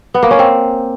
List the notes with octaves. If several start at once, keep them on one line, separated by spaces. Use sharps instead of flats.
B3
A#3
C#4
C4